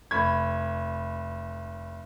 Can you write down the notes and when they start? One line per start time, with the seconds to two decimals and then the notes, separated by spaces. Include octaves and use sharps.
0.11 F1 B5 G#6